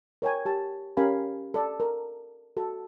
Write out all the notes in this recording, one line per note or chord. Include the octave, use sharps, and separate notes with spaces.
A#4 C#5 G5 G#5
G4 A5
C#4 G4 A#4 F5 G#5 B5
A4 D5
A#4
F#4 A4